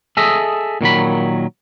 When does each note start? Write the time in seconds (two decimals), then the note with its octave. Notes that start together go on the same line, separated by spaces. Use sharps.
0.17 G#4 A4 D#5 E5
0.81 A#2 D#3 F#3 B5